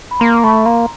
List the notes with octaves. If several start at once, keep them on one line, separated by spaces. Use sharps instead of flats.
B5
A#3 A#5 C6
A3 B5 C#6
A#3 A#5 C6